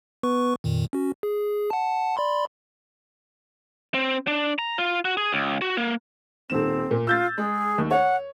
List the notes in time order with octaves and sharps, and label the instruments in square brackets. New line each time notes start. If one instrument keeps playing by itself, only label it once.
[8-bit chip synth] B3 B4 C#6
F2 A#2 D#3
C#4 F#4
G#4
F#5 A5
D5 B5 C6
[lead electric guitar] C4
D4
A#5
F4
F#4
G#4
C#2
F#4
A#3
[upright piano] D#1 D#3 E7 [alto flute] C4
[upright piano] A#2
[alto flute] F4 [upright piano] E6 G6 A6
[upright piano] G#3 [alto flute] G#4
[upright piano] D#2
[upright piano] C#5 [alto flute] F#5